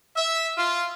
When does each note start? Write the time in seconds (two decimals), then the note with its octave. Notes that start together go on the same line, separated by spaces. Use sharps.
0.16 E5
0.58 F4